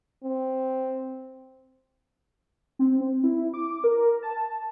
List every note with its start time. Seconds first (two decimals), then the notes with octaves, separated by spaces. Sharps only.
0.24 C4
2.79 C4
3.00 C4
3.24 E4
3.54 D6
3.84 A#4
4.22 A5